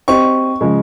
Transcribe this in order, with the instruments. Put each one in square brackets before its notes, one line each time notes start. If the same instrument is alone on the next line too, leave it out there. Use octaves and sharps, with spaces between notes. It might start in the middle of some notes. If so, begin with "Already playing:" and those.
[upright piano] C4 G4 C5 D#5 [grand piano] C#6
[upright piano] C#3 F3 G#3